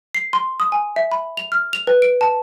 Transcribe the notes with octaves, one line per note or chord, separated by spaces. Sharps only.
C7
C6
D#6
G#5
E5
B5
F7
F6
F7
B4
D7
A5